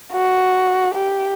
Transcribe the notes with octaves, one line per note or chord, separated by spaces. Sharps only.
F#4
G4